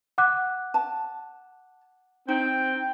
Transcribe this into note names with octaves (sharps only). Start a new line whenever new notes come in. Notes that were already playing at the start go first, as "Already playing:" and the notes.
F#5 D6 F#6
A5
C4 D#4 G5